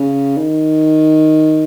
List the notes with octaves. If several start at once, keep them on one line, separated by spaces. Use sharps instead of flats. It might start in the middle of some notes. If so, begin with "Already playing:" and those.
Already playing: C#3
D#3